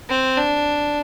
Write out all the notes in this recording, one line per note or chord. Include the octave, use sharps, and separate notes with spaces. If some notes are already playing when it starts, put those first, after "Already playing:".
C4
D4